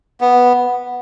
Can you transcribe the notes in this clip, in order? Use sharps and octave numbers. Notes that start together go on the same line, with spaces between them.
B3